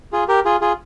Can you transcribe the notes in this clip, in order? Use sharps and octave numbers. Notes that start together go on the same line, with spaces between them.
F4 G#4
G4 A#4
F4 G#4
F4 G#4